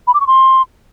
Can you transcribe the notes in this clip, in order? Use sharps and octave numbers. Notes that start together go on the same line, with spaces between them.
B5
D6
C#6
C6